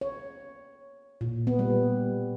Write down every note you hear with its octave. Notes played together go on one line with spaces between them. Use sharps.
C#5
A#2
B3
G3